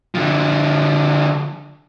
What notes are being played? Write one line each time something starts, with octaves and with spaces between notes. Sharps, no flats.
D3 F3